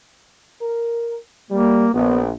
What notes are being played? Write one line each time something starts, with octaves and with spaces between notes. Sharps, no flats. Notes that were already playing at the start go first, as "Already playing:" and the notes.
A#4
G3 A#3
A#1 B3